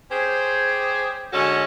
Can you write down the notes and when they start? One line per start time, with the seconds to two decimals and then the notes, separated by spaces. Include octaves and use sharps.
0.11 C#4 G4 G#4 C5
1.32 D3 G#3 C#4 F#4 A4